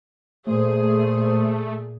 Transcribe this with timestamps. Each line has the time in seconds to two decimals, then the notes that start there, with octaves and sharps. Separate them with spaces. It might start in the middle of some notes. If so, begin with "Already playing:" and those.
0.47 A#2 A3 G#4 C5